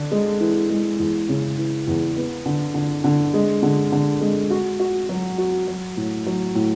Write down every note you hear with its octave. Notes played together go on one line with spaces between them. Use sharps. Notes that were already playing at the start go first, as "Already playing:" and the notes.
Already playing: D3 D4
G#3
E3
G#3
E2
C#3
E3
E2
B3
D3
D3
D3
G#3
D3
D3
G#3
F#4
F#4
F#3
F#4
F#3
A2
F#3
A2